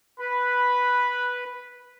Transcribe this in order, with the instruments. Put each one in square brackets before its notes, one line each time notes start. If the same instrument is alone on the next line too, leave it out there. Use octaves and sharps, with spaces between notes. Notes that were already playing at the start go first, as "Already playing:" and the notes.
[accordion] B4 [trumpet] B5